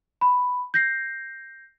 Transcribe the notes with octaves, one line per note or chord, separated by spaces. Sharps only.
B5
G6 A#6 C7